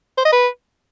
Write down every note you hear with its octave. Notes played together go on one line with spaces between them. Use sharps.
C5
D#5
B4